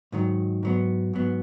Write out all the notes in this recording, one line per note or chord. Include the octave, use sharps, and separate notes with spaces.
G#2 D#3 F#3
G#2 F#3 B3
G#2 F#3 B3